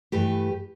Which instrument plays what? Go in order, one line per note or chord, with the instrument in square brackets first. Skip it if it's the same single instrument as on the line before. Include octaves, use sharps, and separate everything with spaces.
[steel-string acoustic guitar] G2 E3 A3 G4 B4